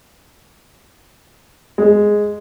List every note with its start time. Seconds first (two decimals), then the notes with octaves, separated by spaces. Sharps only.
1.78 G#3